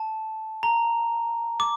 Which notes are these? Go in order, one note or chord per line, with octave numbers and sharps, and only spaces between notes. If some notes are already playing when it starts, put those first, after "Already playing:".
Already playing: A5
A#5
D6